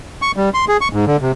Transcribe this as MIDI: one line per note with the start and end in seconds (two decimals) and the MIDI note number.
0.22 0.32 85
0.37 0.50 55
0.54 0.65 84
0.68 0.77 68
0.81 0.88 85
0.93 1.05 44
1.07 1.17 50
1.21 1.32 48